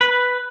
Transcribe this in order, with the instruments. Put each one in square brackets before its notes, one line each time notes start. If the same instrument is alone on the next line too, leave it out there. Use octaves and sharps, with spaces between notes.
[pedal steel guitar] B4